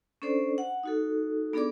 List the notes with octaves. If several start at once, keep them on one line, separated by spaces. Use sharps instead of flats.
C#4 D4 A4 C5 D5
F#5
D#4 F#4 A4
B3 D4 G#4 A4 D5 D6